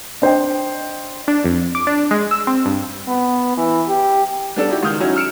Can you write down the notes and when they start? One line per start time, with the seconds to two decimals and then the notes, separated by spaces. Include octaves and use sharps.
0.22 D4 C5 D#5 G5
1.28 D4
1.44 F2
1.75 D6
1.87 D4
2.11 G#3
2.31 E6
2.47 C4
2.65 G2
3.08 B3
3.57 E3
3.88 G4
4.56 G3 B3 D4 A4
4.69 D#4 E4 F#4 G4
4.83 C#2 D#3 D#6 F6 G6
5.00 F#3 C#4 D#4 E4 F#4
5.15 E6 F6 C#7 D7 E7